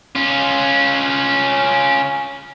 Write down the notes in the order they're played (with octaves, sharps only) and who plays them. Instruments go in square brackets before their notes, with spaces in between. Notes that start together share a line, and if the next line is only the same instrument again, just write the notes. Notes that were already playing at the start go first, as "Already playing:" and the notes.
[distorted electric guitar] C#4 F4